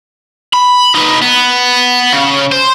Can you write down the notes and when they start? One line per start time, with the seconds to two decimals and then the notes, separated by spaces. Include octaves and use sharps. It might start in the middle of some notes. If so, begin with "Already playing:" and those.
0.53 B5
0.95 D#4 B4
1.22 B3
2.13 C#3
2.52 C5